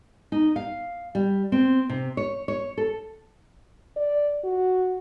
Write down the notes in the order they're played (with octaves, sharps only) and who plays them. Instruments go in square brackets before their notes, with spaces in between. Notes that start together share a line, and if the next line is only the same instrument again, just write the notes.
[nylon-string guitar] D#4
F5
G3
C4
C3
C#5
C#5
A4
[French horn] D5
F#4